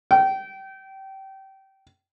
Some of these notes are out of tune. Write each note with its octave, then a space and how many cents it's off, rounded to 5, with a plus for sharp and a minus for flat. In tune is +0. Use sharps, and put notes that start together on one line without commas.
G5 -25